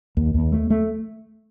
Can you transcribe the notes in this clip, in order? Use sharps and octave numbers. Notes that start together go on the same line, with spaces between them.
D#2
D#2
A3
A3